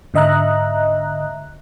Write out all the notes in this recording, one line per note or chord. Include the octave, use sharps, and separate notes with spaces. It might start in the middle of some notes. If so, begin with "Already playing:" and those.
G#2 D3 D#5 E5 A#5 F#6